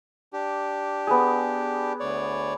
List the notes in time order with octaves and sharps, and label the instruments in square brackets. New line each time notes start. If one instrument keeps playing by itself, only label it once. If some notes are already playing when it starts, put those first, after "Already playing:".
[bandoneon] D4 G4
[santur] B3 G#4
[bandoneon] D2 C#5 D5